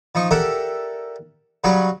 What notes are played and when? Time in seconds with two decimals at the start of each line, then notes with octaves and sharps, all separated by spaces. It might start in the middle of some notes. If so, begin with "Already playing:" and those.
0.15 F3 D#4 C#6
0.31 G4 A4 A#4 D5 E5 F#5
1.64 C#3 F#3 G3 F#4 C#5 C#6